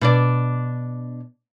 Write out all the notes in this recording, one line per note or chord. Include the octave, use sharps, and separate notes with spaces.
B2 D4 D5